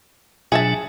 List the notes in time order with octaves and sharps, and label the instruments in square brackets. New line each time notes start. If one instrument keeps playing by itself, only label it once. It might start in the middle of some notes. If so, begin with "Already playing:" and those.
[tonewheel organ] B2 F#3 D4 [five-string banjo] G#4 E5 A5